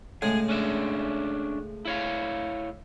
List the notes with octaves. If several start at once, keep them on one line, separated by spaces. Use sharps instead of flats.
A2 C#3 G#3 G#4
C#4 D4 E5
E4 C#5 F5